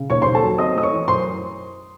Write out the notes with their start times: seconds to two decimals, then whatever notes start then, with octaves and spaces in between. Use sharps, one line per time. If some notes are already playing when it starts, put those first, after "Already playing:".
Already playing: C#3
0.10 D#2 C#5 C#6
0.22 D#2 C5 C6
0.34 A4 A5
0.42 F#3
0.58 C4 D#5 D#6
0.75 A3 D#6
0.83 C#5 C#6
0.92 E3
1.08 F#2 C5 C6